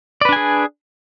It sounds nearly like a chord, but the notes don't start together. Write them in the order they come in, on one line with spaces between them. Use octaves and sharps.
D5 B4 D4 G#5 G#4